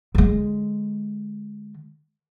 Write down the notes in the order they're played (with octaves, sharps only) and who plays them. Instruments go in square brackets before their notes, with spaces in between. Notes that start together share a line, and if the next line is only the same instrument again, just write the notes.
[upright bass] D3 G#3